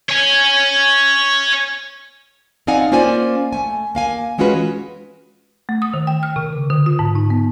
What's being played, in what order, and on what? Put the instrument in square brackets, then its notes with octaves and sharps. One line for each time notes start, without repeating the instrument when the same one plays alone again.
[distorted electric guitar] C#5 G#5
[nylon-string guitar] C4 D#4 D5 F5 F#5 G#5
A#3 C#4 F4 C5 D5 G#5
A3 G#5
A#3 F5 G#5
E3 G#3 C#4 F4 F#4 B4
[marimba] A3
D#6
D#3
G5
F6
C3
C#3
D3
F4
G#2
D#4
B3